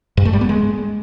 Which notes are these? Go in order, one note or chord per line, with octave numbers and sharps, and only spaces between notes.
G2
A3
G3
B3
G#3